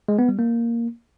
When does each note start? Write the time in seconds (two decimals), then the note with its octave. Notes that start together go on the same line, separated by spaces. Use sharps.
0.08 G#3
0.19 B3
0.29 G3
0.39 A#3